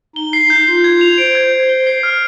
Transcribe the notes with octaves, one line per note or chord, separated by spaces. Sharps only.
D#4 G7
C7
G6
F4 C7
G#6
F7
C5 D7
G#6
F7
G7
C7
F6